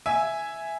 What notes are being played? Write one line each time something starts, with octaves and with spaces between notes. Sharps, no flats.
E5 G#5